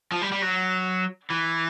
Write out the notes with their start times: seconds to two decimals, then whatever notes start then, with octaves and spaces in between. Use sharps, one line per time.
0.12 F3
0.22 G3
0.32 G3
0.42 F#3
1.30 E3